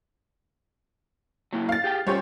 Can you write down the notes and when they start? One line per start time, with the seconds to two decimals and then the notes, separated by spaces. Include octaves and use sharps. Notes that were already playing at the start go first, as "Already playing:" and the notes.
1.53 F#3 A#3 E4
1.69 F5 A6
1.84 G4 G#4 G5
2.07 G3 C#4 F4 G4 C5 C#5